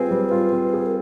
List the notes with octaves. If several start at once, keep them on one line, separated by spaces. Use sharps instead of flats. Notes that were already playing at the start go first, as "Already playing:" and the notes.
Already playing: G3 C4 F4 G#4 B4
G3
F4
C4
G#4
A#4